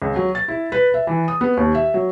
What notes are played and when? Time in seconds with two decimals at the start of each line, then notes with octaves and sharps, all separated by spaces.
0.02 C#2
0.16 F#3
0.35 A6
0.48 E4
0.72 B4
0.94 E5
1.07 E3
1.28 D#6
1.41 B3
1.57 D#2
1.75 E5
1.94 F#3